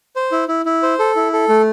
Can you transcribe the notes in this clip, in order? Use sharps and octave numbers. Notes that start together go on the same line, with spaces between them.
C5
E4
E4
E4
C5
A4
E4
A4
A3